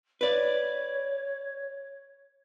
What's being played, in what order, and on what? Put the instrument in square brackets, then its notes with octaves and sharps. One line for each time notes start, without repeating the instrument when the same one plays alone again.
[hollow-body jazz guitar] B4 D5 [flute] C#5